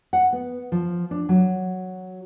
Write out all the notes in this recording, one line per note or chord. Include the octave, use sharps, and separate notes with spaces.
F#5
B3
F3
D4
F#3